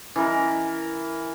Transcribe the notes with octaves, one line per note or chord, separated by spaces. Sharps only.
E3 A#4